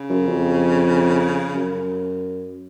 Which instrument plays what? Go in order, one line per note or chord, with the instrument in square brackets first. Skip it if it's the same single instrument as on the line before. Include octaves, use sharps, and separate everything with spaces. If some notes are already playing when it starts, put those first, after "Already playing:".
Already playing: [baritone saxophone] C#3
[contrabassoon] F#2
F2
F#2